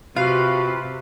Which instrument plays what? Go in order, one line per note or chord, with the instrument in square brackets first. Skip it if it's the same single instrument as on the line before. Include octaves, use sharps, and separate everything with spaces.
[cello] C3 [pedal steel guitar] F4 B4 [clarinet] F#4 [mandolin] F5